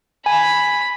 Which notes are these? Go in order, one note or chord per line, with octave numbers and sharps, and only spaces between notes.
G#5 B5